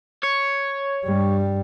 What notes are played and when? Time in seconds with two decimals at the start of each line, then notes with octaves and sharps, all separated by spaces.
0.23 C#5
1.06 G2 G3